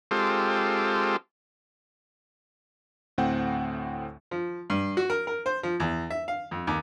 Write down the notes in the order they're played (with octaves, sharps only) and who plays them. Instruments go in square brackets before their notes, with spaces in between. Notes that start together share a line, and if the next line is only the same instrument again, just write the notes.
[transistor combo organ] G#3 C4 F4 G4 A4
[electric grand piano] D2 A2 C4 F#5 G5 G6
[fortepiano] F3
G2
F#4
A#4
A#4
C5
F3
E2
E5
F5
F2
D#2